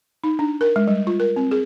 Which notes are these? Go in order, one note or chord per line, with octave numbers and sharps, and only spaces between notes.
D#4
D4
A#4
G#3
G3
F4
A#4
C4
G#4